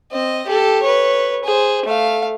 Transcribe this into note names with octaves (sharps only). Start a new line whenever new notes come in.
C4 D#5
G4 A4
B4 C#5
G#4 C5
A3 F5